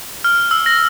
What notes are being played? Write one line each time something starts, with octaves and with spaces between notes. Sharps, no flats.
F6
E6
A#6